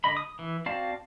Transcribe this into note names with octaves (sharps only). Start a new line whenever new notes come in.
D3 D#5 B5
D#6
E3
C4 F#4 D5 F5 A5